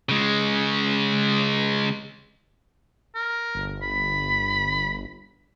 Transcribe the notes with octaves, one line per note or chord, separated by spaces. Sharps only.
C#3 G#3
A#4
G1
B5